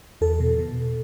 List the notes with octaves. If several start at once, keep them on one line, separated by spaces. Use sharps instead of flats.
E2 A4
B2
B2